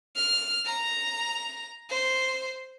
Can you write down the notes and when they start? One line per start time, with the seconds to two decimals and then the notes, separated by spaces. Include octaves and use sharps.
0.16 F6
0.66 A#5
1.90 C5